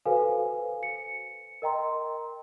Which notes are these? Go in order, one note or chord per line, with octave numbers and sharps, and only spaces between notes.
F#4 A4 B4 C5 F5 G#5
C#7
A#4 D#5 G5 A#5 C6